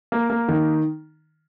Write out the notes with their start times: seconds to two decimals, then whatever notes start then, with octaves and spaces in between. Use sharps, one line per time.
0.12 A#3
0.30 A#3
0.48 D#3